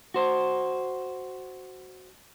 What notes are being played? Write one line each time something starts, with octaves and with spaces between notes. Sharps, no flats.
F#4 C5